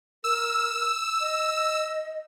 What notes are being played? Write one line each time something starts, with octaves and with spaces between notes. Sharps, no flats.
A#4 E6
D#5